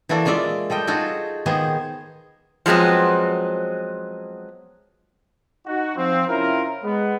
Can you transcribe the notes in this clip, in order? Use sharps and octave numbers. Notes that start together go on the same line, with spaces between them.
E3 A#3 F#4 A4 D5
G#3 A#3 F4 D5 E5
G3 A4 D#5 G5
D#4 F4 F#4 G#4 A4
D#3 A#3 B3 G#4 C5
F3 F#3 G#3 B3 C4
D#4 F#4
F3 C4
C3 C#4 E4 F4 A#4
G#3 B3